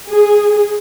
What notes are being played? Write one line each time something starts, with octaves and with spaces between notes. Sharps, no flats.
G#4